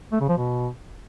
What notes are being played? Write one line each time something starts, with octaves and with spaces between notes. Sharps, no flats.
A3
C#3
F3
B2